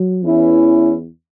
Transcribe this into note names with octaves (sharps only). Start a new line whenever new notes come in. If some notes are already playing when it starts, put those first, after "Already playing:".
Already playing: F#3
E2 E3 C#4 E4